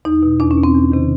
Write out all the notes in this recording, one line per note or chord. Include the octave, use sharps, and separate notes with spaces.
E2 D#4
B2
E2 D4
C#4
B2
C4
E2
C3 D#3